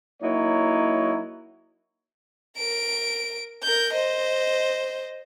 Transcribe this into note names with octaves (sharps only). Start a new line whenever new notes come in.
F#3 A#3 D#4 E4 C#5
A#4 D7
A#4 G6
C5 D#5